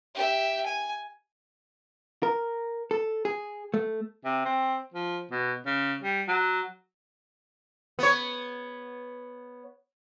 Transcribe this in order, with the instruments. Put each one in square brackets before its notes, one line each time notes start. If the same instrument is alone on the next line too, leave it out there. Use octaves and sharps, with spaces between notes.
[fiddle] G4 E5
G#5
[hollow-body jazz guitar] A#4
A4
G#4
A3
[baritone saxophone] C3
C4
F3
B2
C#3
G3
F#3
[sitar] B3 C#5